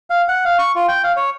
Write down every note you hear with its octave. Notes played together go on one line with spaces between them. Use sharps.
F5
F#5
F5
C#6
F4
G5
F5
C#5